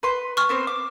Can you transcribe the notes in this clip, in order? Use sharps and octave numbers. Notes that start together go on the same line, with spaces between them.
B4 C6
C#6 F6
B3 C4 C5
D6